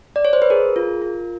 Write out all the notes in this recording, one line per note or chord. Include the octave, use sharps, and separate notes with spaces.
D5
C#5
C5
B4
G#4 A#4
F4
F4